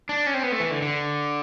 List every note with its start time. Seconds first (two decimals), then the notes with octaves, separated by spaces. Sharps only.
0.09 D4
0.26 C#4
0.34 C4
0.43 B3
0.52 A3
0.60 E3
0.71 D3
0.82 D3